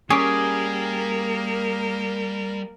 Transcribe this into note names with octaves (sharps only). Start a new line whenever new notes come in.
G3 A#3 C#4 G#4 A#4 D6